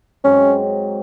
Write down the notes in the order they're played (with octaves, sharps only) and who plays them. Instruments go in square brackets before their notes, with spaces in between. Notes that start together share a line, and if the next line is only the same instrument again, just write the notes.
[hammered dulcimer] G#2 F#3 C4 [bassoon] C#4